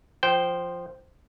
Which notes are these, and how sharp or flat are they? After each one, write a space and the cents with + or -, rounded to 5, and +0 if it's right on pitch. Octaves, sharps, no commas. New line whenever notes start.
F3 +0 C5 +0 G5 -15